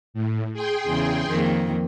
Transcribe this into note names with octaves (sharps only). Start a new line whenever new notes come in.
A2
G#4 G5 C6
E2 C#3
F2 D#3 A#3